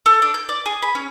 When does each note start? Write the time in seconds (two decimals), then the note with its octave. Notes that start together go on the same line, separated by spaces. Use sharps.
0.06 A4
0.22 D4
0.34 G6
0.49 D5
0.66 G#4
0.82 B5
0.95 C#4